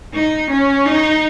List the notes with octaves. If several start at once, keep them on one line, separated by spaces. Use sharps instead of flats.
D#4
C#4
D#4